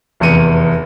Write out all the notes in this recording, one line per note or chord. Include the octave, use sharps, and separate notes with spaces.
F1 E2 C#7 D#7